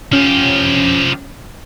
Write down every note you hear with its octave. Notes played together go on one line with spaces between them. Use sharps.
F3 C#4 G4